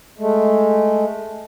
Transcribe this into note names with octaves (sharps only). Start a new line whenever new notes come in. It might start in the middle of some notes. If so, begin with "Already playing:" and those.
G#3 A3